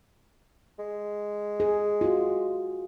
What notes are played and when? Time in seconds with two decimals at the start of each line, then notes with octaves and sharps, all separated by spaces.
0.79 G#3
1.60 G#4
2.01 F4 F#4